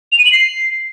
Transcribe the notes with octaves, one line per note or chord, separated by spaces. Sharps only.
F7
D#7
F#7
C7